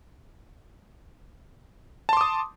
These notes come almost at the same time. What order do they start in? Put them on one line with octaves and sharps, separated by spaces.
A5 C6 D6 D#6